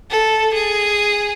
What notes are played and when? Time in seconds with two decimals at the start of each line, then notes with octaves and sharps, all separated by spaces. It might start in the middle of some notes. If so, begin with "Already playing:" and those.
0.10 A4
0.54 G#4